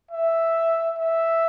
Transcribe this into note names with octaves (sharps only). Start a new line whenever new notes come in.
E5
E5